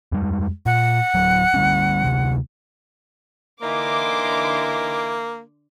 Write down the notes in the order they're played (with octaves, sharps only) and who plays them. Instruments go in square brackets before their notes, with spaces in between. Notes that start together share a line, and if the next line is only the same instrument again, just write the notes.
[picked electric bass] F2 G3 G#3
[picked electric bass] A#2 [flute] F#5
[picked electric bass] D1 F#3
D3 G3 C#4
D2 C3
[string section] D3 C6 D6 [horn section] E3 D#4 E4 [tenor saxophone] A#3